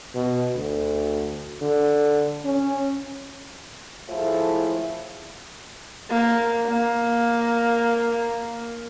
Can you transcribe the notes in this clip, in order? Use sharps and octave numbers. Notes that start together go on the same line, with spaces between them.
B2
D2
D3
C#4
G#1 A2 F3 A3 E4 G#4
A#3
A#3